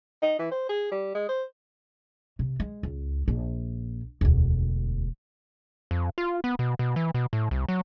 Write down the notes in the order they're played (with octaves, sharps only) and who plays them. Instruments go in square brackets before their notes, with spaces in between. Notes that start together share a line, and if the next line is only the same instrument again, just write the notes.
[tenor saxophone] D#4
E3
C5
G#4
G3
G#3
C5
[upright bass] C3
G#3
C#2
A#1
E1 D2
[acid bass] F2
F4
B3
B2
B2
E3
B2
A2
C2
F#3